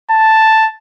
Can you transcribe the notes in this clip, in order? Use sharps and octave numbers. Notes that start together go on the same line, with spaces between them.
A5